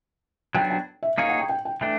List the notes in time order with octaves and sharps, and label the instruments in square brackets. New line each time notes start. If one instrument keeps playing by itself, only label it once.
[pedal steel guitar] F#3 B3 D4 [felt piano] G5
[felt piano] G5
E5
[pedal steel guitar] A#3 D#4 G#4 C#5 [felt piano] F5
[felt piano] F#5
G5
G5
G5
[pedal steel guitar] E3 A3 D4 [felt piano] G5